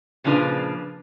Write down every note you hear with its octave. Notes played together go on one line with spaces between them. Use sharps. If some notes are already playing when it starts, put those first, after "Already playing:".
A#2 C#3 F3 D4 G#4 B4